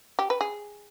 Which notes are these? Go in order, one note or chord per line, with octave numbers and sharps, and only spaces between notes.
G4
B4
G#4